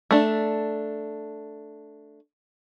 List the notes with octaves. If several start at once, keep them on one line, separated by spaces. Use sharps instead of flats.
A3 D4